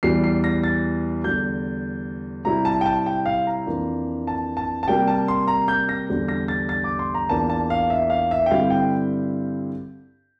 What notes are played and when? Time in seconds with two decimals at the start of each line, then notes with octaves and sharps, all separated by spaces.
0.03 E2 E3 G3 C7
0.24 C7
0.44 A#6
0.64 A6
1.24 E2 D3 G3 G6
2.45 C3 G3 C4 E4 A#5
2.65 A5
2.81 G5
2.86 A5
3.06 G5
3.26 F5
3.47 A#5
3.66 F2 E3 A#3 D4 F4
4.27 A5
4.57 A5
4.83 A5
4.87 C3 G3 A#3 G5
5.08 A5
5.28 C6
5.48 A#5
5.68 G6
5.89 A#6
6.09 E2 D3 G3 D4
6.28 A#6
6.48 A6
6.69 A6
6.84 D6
6.99 C6
7.14 A#5
7.29 E2 E3 A#3 D4 F4 A5
7.50 A5
7.70 F5
7.90 E5
8.10 F5
8.31 E5
8.46 G5
8.51 G2 D3 G3 C4 E4 F5
8.70 G5